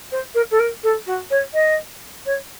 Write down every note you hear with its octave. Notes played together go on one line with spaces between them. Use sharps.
C5
A#4
A4
A#4
A4
F#4
C#5
D#5
C#5